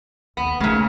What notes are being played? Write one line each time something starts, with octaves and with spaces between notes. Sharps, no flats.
D#2 B3
A#2 C#3 A3 D#4